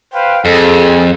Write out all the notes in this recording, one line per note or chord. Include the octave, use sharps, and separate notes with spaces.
B4 C5 F5 G5
F2 G#4 A4